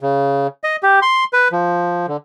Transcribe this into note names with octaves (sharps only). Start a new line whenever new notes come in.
C#3
D#5
G4
C6
B4
F3
D3